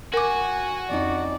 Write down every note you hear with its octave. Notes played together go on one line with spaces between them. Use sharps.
F#4 A#4 G#5 D6
F2 C#4 D#4 D5